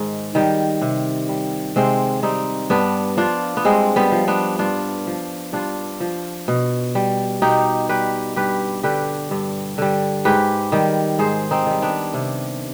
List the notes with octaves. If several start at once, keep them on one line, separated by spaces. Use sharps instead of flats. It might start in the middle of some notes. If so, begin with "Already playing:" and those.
Already playing: G#2 D#3
D#3 G3
C3
G3
C3 G#3 C4
G3 C4 D#4
G2 B3 D4
F3 D4 F4
B3
G2 G#3 C4
G3 B3
F3
B3 D4
G2 D4 F4
F3
G2 D4 F4
F3
B2
G3
B2 D#4 G4
G3 G4 B4
G2 G4 B4
D3 G3 G4 B4
G2
D3 G3
G#2 G4 B4
D#3 G3
G#2 G#4 C5
C4 D#4
D#3 G3
B3 D4
C3